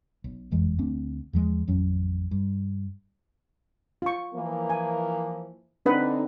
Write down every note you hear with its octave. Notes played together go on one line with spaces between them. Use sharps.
B1
F#1 F2 E3 G#3
D2 A3 C4 D4
E2 F3 G#3
A1 F2 F#3 C#4
G2
F4 C#6
E3 F3 A#3
G#5
D3 C4 D4 D#4 B4 F#5